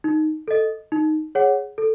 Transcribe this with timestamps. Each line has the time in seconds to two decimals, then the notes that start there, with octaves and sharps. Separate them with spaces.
0.04 D#4
0.48 A4 D#5
0.92 D#4
1.35 G#4 C#5 F#5
1.78 A4